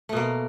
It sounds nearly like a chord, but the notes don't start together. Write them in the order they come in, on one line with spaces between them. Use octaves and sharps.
A3 B2 A#3